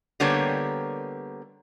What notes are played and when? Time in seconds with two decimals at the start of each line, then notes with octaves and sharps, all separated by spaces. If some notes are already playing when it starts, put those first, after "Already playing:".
0.20 D3 G3 A#3 B3 G4 C#5